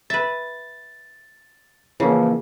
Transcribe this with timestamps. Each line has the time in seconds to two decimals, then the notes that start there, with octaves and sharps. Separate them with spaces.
0.10 B4 E5 A6
2.00 C#3 E3 F3 A#3